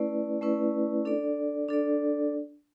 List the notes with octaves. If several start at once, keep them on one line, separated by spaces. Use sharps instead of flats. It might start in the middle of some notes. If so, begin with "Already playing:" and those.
Already playing: A3 C#4 E4 B4 D5
A3 C#4 E4 B4 D5
D4 A4 D5
D4 A4 D5